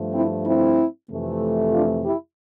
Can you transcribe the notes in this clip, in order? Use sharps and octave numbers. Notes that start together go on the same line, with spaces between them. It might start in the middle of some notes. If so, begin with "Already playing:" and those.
Already playing: G2 F3 A3
C4 E4
C4 E4
F2 C3 E3 A3
D4 F4
E4 G4